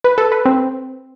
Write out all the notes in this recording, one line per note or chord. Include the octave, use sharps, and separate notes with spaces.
B4
A4
B4
C4